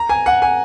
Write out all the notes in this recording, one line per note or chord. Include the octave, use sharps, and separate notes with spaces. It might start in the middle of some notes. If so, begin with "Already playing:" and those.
Already playing: A#5
G#5
F#5
G#5